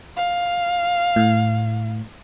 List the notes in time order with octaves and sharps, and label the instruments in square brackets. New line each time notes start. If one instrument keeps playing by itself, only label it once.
[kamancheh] F5
[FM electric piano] A2